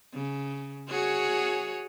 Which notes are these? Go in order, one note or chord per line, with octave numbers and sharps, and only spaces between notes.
C#3
F#4 G#4 C#5